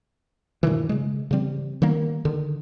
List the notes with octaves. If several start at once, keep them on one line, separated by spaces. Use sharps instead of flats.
G2 B2 D#3 E3
C#3 G#3
C#3 E3 G3 C4
D#3 G3 A#3 B3
D3 D#3